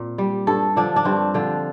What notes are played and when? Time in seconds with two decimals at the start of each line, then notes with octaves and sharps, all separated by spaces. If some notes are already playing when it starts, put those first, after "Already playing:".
Already playing: A#2 C4
0.18 G3
0.47 G2 A4
0.76 D3 F3 D4
0.96 D4
1.05 G2 C4
1.34 D3 F3